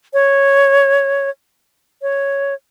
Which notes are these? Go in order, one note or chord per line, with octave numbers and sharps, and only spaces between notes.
C#5
C#5